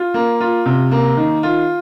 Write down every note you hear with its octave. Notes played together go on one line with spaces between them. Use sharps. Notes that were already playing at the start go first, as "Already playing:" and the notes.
Already playing: F4
A#3
F4
C3
A#3
D#3
F4